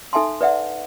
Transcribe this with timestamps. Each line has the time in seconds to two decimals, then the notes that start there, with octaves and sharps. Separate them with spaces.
0.13 D#4 A4 E5 G#5 A5 C6
0.41 B4 D5 E5 F#5